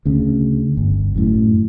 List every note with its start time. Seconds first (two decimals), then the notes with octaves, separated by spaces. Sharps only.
0.05 D2 C#3
0.77 G1
1.16 F#2 A2